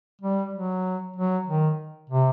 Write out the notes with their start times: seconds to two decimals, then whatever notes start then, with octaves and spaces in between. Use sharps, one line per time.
0.22 G3
0.53 F#3
1.16 F#3
1.47 D#3
2.10 C3